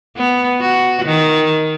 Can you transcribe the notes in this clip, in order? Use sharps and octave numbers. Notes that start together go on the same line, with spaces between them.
B3
F#4
D#3